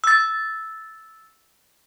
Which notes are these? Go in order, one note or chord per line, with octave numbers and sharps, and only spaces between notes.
E6 A6